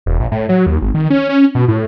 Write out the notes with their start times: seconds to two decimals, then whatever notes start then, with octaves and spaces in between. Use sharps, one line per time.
0.06 E1
0.20 A#1
0.32 A2
0.49 F#3
0.67 D#2
0.82 G#1
0.94 D#3
1.10 C#4
1.29 C#4
1.55 B2
1.68 A2